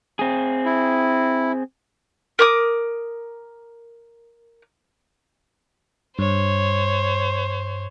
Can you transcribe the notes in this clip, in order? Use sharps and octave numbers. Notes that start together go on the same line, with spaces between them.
C4 G#4
E4
A#4 D6 D#6
G2 C5 C#5